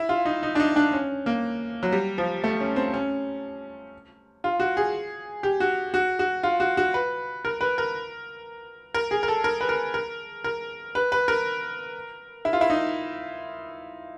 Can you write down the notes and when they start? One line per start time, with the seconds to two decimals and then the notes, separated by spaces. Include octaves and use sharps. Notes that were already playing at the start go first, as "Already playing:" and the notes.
Already playing: E4
0.09 F4
0.25 D#4
0.43 D#4
0.55 D4
0.60 D#4
0.76 D4
0.93 C#4
1.26 A#3
1.83 F#3
1.92 G3
2.18 F3
2.44 A3
2.60 C#4
2.76 C4
2.94 C#4
4.44 F4
4.60 F#4
4.77 G#4
5.43 G4
5.60 F#4
5.94 F#4
6.19 F#4
6.43 F4
6.60 F#4
6.77 F#4
6.94 B4
7.45 A#4
7.61 B4
7.78 A#4
8.94 A#4
9.11 G#4
9.23 A#4
9.28 A4
9.44 A#4
9.61 B4
9.69 A#4
9.94 A#4
10.44 A#4
10.95 B4
11.12 B4
11.28 A#4
12.45 E4
12.53 F4
12.61 E4
12.70 D#4